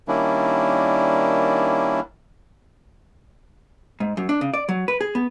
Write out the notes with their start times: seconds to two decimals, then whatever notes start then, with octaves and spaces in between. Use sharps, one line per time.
0.08 D#3 G3 A#3 C#4 D4 E4
4.00 G#2
4.17 F#2
4.29 D4
4.41 C#3
4.54 D5
4.69 F#3
4.88 B4
5.01 G#4
5.15 B3